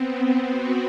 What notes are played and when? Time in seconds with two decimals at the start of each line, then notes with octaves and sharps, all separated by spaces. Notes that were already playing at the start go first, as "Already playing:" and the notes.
Already playing: B3 C4
0.19 C4
0.49 F#4